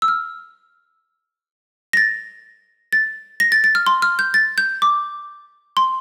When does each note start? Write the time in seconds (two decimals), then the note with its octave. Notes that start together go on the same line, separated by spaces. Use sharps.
0.02 E6
0.08 F6
1.93 A#6
1.97 A6
2.93 A6
3.40 A#6
3.52 A6
3.64 A6
3.75 F6
3.87 C6
4.02 F6
4.19 G6
4.34 A6
4.58 G6
4.82 D6
5.77 C6